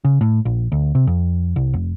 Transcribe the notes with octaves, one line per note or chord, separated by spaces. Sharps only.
C#3
A2
A#1
D2
C3
F2
C2
F1